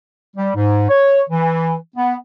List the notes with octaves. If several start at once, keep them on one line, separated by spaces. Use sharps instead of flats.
G3
G#2
C#5
E3
B3